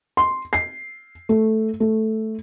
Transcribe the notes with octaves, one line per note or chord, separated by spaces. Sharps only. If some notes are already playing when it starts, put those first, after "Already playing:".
C6
C7
A3
A3